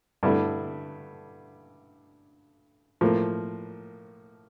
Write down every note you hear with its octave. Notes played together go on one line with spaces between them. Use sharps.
G2 D3 A3 E4
A2 F3 A#3